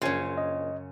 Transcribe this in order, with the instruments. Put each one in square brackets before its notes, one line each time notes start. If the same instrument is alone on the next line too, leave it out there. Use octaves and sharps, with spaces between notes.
[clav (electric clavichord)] A#1 [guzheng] F#2 C#3 [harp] C#5 G#5 C6
[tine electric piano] D#5